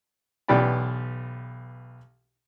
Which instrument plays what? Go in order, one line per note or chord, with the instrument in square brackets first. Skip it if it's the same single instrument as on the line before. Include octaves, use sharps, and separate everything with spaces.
[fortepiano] B1 E3 B3 G4 D5 B5